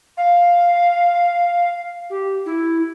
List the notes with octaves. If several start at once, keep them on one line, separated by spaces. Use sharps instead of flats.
F5
G4
E4